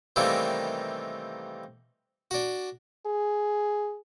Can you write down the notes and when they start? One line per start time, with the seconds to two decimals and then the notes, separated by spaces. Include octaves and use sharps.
0.16 C3 D#3 E3 G3 A3 A#3
2.31 D4 F#4
3.07 G#4